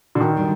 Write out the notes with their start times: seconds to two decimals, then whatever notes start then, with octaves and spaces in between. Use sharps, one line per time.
0.15 D3
0.21 D#3
0.36 D3 G3 D4